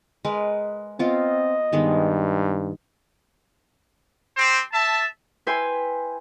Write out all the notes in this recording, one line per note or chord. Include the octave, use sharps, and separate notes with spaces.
G#3 A#4 B4
B3 C4 F4 A#4 D#5
G2 D#3 G#3 B3
C4 G4 C5
E5 A5
E4 B4 G5 G#5 C6